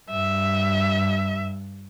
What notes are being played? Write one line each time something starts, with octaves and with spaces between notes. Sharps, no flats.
G2 E5